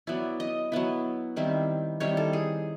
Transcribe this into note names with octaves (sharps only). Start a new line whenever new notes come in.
F#3 B3 E4 D5
D#5
F#3 B3 E4
D#3 G3 C4 E4
D#3 G3 C4 E4 C#5
A4
G#4